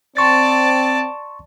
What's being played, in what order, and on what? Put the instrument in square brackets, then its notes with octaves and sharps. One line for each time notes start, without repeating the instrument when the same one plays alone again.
[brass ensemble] C4 [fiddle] D5 A5 [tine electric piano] C6 C#6 A6